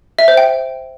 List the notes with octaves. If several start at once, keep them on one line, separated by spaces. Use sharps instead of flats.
E5
C5
G5